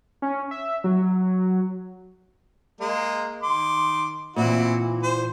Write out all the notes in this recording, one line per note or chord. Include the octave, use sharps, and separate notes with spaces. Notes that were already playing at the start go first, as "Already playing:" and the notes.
C#4
E5
F#3
G#3 A#3
D#3 C6 D6
A#2 E3 C4 E4 F#4
C5